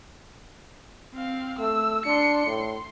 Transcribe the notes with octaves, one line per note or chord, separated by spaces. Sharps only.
C4 F5
A3 E6
D4 C6 C#7
A2 C6